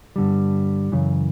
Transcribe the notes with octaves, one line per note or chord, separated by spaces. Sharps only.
G2 D3 G3
F#2 C#3 E3